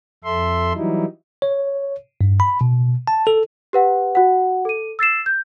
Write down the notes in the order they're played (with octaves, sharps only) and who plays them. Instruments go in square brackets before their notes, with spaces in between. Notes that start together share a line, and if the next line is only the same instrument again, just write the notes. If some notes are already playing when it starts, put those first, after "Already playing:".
[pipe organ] F2 A4 E5 C6
E3 F#3 G3 D#4 E4
[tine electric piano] C#5
G2
B5
B2
A5
A4
[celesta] G4 B4 F#5
F#4 F#5
A4 D#7
E6 A6 C7 E7
G6